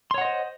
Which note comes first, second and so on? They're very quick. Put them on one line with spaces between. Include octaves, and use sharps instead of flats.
C6 C#5 F#5 D#5 C5